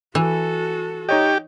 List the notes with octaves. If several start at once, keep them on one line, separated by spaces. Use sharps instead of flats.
E3 F#4 A4
D#4 G4 C#5 D#5